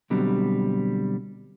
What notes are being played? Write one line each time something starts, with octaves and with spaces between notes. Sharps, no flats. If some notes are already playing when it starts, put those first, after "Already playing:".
B2 D3 F#3 G3 C4